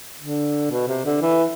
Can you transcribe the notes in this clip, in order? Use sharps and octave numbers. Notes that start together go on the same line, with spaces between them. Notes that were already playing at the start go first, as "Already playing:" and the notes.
D3
B2
C3
D3
E3